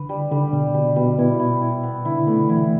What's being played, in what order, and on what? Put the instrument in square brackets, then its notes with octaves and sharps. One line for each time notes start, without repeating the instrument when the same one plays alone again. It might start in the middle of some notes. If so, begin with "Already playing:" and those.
Already playing: [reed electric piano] D3 [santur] B4
[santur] G3
[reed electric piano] D3 [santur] G3
[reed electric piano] B2 [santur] G3
[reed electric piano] B2 [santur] G3
[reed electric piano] B2 [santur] G3
[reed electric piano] B2 [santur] E4
[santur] E4
E4
B3
[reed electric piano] D3 [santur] E4
[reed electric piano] A3 [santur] B3
[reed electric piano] E3 [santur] E4